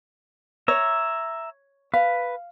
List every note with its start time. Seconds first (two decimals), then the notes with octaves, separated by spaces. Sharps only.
0.68 C#5 E5 A#5
1.94 B4 F5